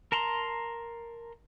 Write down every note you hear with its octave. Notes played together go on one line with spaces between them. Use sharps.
A#4 A5 A#5 C6